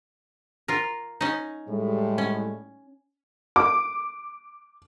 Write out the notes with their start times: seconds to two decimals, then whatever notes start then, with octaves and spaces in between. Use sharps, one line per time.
0.68 F4 A#4
1.21 C#4 D#4
1.69 A2 G3 G#3
2.18 C#4
3.56 D6